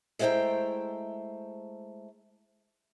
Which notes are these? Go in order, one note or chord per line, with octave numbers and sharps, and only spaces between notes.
G#3 A3 E4 C5 G5 A#5